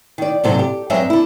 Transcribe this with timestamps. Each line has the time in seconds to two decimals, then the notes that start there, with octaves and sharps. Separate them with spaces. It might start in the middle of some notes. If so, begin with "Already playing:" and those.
0.18 D#3 D5
0.44 G#2 C3 F#3 A4 C5
0.59 G4
0.90 G2 F#3 G#3 C4 C5 E5
1.10 D3 E4